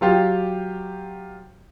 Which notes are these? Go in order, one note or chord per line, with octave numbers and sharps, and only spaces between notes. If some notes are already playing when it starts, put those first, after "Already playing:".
F#3 F4 G4